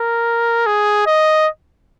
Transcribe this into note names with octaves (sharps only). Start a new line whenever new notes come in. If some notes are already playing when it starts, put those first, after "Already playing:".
Already playing: A#4
G#4
D#5